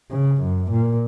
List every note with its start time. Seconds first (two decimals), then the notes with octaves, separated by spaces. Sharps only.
0.11 C#3
0.41 F#2
0.70 A#2